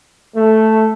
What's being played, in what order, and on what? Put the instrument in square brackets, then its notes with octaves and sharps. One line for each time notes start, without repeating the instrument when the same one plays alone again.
[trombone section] A3